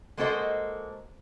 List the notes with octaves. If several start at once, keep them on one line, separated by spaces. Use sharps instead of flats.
G#3 A#3 F#4 A4 C5 D#5